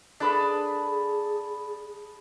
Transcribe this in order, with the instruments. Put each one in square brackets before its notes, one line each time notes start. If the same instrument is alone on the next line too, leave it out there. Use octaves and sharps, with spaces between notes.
[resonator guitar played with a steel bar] D4 A4 B4 [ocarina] G#4 [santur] A5 B5 D#6